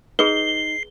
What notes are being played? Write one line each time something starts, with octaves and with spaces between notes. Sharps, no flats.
D#4 G#4 B4 C7 G7